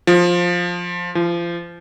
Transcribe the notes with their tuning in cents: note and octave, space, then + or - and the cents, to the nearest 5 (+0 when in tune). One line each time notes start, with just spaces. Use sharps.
F3 +10
F3 -30